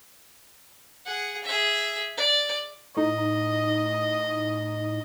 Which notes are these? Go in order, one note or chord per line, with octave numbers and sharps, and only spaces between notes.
G#4 F#5
G#4 E5
D5
A2 D#4 D#5